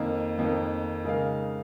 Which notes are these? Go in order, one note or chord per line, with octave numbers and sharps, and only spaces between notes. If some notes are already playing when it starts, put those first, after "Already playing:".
Already playing: F2 D#3 A#3
F2 D#3 A#3
C#3 G#3 D#4 A#4 F5